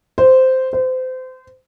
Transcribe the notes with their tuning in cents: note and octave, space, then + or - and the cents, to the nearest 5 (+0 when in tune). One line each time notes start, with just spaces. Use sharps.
C5 -10
C5 -30